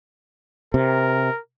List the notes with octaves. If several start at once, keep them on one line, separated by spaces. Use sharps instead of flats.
C3 A#4